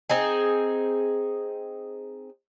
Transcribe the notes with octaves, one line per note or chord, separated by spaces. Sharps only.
C4 D#4 G#4